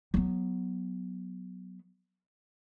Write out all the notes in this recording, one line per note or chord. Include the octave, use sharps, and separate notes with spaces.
F#3 B3